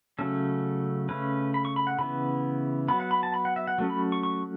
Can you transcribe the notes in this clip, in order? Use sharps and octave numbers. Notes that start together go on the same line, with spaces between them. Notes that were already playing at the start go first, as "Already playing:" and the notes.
C#3 F#3 A3 C#4 A4
C#3 A3 C#4 B4
B5
C#6
B5
F#5
C#3 E3 B3 B5
F#3 B3 B5
F#5
B5
A5
B5
F#5
E5
F#5
F#3 A3 C#4
B5
C#6
C#6